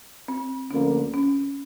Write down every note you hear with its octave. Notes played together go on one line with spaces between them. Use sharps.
C4
D2 D3 F3 A#3 C#4
C#4